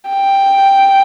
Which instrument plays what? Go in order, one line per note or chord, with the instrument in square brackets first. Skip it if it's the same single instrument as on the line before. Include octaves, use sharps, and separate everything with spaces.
[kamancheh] G5